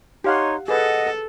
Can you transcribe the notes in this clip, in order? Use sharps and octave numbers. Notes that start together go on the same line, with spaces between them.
D#4 G4 C#5 F5 F#5 C6
G#4 A4 B4 D#5 F#5